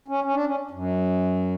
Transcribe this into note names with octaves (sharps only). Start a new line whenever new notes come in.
C#4
C#4
D4
C#4
F#2